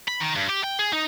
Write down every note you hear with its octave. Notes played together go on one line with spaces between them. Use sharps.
B5
D#3
G2
G4
G5
G#4
D#4